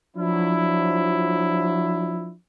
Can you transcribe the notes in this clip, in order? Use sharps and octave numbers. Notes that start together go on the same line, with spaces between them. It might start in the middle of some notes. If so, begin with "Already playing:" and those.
F3 F#3 D4 E4